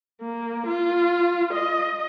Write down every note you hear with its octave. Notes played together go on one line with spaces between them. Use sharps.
A#3
F4
D#5